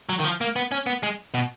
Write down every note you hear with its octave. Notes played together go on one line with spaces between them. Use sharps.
F#3
D#3
F3
A#3
B3
C#4
B3
G#3
B2